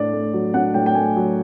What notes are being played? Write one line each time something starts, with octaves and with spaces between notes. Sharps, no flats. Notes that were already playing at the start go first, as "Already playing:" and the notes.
Already playing: A2 D4 D5
A3
F#3
D4 F#5
A2 G5
G5
A3 G#5
F#3